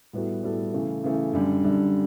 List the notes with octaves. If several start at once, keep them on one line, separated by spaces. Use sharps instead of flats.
A2 G3 B3 F#4 A4
A2 G3 B3 F#4 A4
C#3 E3 A3
C#3 E3 A3
F#2 D3 G3
F#2 D3 G3